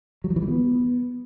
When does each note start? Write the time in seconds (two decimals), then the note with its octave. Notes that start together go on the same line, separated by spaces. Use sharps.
0.24 F#3
0.30 F3
0.36 E3
0.42 G3
0.48 B3